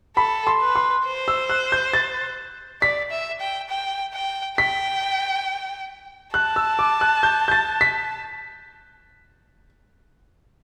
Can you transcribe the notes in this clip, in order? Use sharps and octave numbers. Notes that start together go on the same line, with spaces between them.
A4 B5
C6
B4
C6
C5
E6
F#6
G6
A6
D5 B6
E5
G5
G5
G5
G5 B6
A5 F#6
E6
D6
F#6
G6
G6
A6
B6